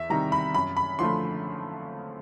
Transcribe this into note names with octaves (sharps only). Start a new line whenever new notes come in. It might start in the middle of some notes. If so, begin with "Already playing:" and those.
Already playing: E2 E5
C3 D#3 G3 A#5
B5
F#2 B5
B5
D3 F3 A3 C6